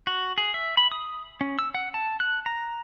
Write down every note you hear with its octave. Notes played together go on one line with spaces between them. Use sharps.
F#4
G#4
E5
B5
D#6
C#4
E6
F#5
A5
F#6
A#5